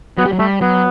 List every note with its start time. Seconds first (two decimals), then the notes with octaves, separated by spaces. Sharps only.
0.18 F#3 B3
0.25 G3
0.33 F#3
0.39 G3 A3
0.61 F#3 B3